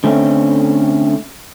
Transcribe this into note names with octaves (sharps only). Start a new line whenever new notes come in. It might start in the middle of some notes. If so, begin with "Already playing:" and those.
D3 A3 C4 C#4